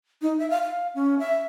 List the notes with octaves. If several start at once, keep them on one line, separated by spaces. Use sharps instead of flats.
D#4
E5
F5
F5
C#4
E5